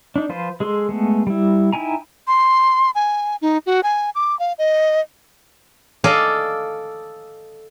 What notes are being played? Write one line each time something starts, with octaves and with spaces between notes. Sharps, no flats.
D4 D#4
F3 F4 B4 C5
G#3 G#4 A4 C6
G#3 A3 B3
G3 E4
D#4 E4 G5 G#5 A#5
C6
G#5
D#4
F#4
G#5
D6
F5
D#5
A4 D5 D#5 F5 G#5